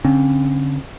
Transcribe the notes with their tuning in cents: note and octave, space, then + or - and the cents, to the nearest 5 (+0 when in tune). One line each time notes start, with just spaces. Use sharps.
D3 -40 C4 +45